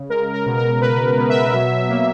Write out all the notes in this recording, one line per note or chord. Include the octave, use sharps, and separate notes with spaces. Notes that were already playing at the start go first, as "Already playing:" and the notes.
Already playing: C#3
G#3 A#4
A#4
B2
A#4
B2 B4
B2
E5
F#3
A#3